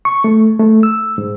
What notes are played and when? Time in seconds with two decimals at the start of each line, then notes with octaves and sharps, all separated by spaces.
0.05 C#6
0.24 A3
0.59 A3
0.83 E6
1.18 G#2